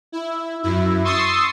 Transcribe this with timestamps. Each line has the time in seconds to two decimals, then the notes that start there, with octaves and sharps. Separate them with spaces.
0.12 E4
0.63 F#2 E4
1.04 C6 C#6 D#6 E6 A6 C7